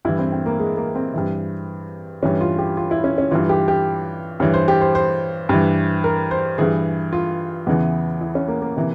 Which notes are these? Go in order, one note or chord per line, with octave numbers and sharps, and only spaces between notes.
G2 E3 E4
C4
C4
A#3
G#3
A#3
C4
G2 E3
G2 E3 C#4
F4
G4
F4
E4
C#4
C#4
G2 E3 F4
G4
G4
G2 E3 C#5
C5
G4
C5
C5
G2 E3
A#4
C5
G2 E3 G#4
F4
E2 C#3 E3
E4
C#4
A#3
A#3
C3 E3